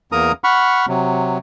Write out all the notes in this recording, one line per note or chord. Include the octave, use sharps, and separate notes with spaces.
E2 A#3 A#4 A#5 D#6
F#5 B5 C#6 F6
C3 F#3